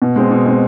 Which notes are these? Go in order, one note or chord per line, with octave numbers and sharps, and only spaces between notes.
B2
G#3 C4
B2
G#3 C4